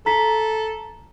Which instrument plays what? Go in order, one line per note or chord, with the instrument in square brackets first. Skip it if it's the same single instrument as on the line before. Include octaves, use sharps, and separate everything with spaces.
[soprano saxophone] A4 [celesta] A#5 B6